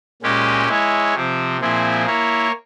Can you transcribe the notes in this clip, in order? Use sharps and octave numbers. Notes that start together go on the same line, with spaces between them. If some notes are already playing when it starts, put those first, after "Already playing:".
A#2 G#3 C#4 G4
G#3 E4 G#4 C#5
C3 F3 C4
A#2 F3 C4 E4 G#4
A#3 E4 A#4 C#5